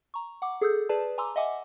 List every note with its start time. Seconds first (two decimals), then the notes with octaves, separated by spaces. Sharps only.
0.14 A#5 C#6
0.42 F#5 D6
0.61 G#4 A4 D#6 E6 G6
0.89 G#4 B4 D5 A5
1.18 G#5 A#5 C6 D6 E6
1.36 D#5 E5 F#5 G#5 D6